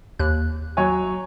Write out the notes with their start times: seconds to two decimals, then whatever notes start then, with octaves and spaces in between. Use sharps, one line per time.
0.19 D#2 F#6
0.77 F#3 C#5 G#5